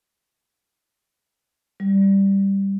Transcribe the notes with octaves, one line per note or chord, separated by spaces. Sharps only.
G3